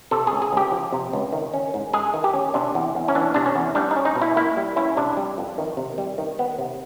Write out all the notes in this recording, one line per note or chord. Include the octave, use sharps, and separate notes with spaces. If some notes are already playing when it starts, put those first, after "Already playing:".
C3 A4
C#2 G#4
G#4
C#2 G4
F3
C3
C#2
D#3
C#4
G#2
G#3 G#4
D#3
G4
C#4
C3 D4
E2
E2
C#4
E3 D4
C3 D4
C#4
E2
G3 D4
D#4
C#4
D#4
B2
E4
A#3 E4
G3
C#4 E4
C3 D4
G3
F2
D#3
C3
G3
D#3
B3
C3